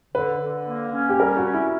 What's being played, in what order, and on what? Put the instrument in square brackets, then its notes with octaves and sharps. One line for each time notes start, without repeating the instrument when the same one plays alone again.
[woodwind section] D3 [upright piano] B4
[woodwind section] D3
A#3
C#4
[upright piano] G4
[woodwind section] G3 [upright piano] A#4
[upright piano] F#4
[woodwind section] C#4
[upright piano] E4